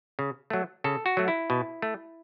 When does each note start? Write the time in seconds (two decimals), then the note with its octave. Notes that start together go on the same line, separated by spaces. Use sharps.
0.19 C#3
0.50 F#3 A3
0.84 C#3 A4
1.06 F#4
1.17 F#3 A3
1.28 E4
1.50 B2
1.82 A3